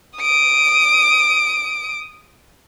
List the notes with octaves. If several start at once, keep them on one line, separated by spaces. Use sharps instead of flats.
D#6 D7